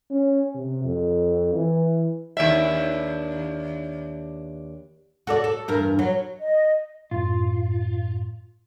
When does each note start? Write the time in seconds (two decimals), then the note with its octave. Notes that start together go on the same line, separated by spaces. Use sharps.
0.10 C#4
0.54 C3
0.84 F2
1.54 E3
2.37 D#2 D4 E5
5.27 F#4 A4 D5
5.44 A4
5.68 E2 G2 A#4
5.99 F#3
6.40 D#5
7.11 F#2 A2 F4